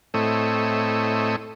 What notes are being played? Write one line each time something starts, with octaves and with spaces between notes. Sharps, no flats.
A2 A3 C4 E4 C#5 D#5